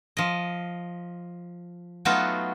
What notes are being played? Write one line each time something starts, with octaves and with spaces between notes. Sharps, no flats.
F3 D#5
F#3 A3 B3 D#4 F4 F#4